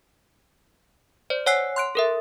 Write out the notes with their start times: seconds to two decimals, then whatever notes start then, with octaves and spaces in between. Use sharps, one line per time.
1.30 C5 D5
1.46 C#5 F#5 G#5 E6 F#6 C7
1.76 C6 F#6 D7
1.95 A4 A#4 E5